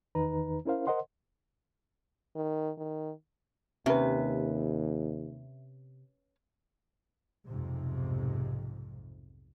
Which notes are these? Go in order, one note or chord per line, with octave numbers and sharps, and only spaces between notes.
E2 D#3 D#4 B4 A#5
C#4 E4 A#4 C5 F5
A#4 C5 D#5 F#5 C6
D#3
D#3
D#2 C3 C#4 B4 E5
B1 F2 G#2 C3